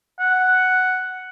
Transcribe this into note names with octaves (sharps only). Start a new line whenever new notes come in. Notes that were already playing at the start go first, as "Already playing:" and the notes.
F#5